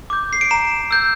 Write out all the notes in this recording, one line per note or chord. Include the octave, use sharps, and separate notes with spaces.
D6 G6
C7
D7
A#5 E7
E6 G6